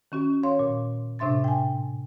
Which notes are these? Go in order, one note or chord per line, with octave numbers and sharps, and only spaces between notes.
D#3 C#4 F#4
C#5 F5 C6
A#2
A2 C3 D4 E5 C6 A6
G5 G#5